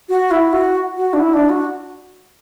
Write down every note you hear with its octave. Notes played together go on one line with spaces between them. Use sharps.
F#4
E4
F#4
F#4
D4
E4
D4
F#4